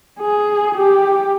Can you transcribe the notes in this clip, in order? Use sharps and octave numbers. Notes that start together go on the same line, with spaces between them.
G#4
G4